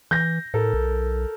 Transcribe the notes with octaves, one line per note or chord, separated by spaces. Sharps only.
E3 G6 A#6
A2 A4 A#4
B1